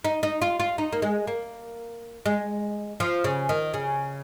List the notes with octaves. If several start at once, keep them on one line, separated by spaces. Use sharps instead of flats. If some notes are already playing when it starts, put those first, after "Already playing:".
D#4
D#4
F4
F4
D#4
A#3
G#3
A#3
G#3
F3
C#3
D#3
C#3